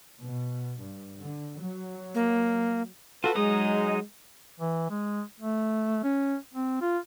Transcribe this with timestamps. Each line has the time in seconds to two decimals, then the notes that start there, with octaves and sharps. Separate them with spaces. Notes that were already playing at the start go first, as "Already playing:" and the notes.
0.21 B2
0.79 G2
1.19 D3
1.59 F#3
2.14 A#3
3.24 F4 F#4 A4 B4
3.35 F#3 G#3 D#4 D#6
4.60 E3
4.90 G#3
5.40 A3
6.03 C#4
6.54 C4
6.81 F4